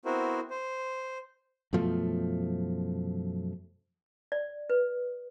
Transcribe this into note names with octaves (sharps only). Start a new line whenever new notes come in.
B3 C4 E4 F#4 A#4 C5
C5
F#2 B2 F3 A3
D5
B4